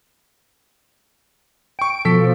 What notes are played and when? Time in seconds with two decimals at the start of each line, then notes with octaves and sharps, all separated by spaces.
1.79 G5 C#6 D7
2.05 B2 F3 A4 B6